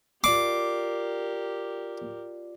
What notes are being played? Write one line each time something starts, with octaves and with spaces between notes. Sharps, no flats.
F4 G4 A#4 D5 D6 C7